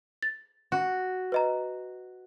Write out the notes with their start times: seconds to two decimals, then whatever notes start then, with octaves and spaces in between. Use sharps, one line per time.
0.23 A6
0.72 F#4
1.32 B4 D#5 A#5